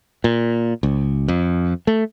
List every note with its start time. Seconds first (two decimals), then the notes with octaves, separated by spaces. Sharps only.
0.24 A#2
0.83 C#2
1.28 F2
1.87 A3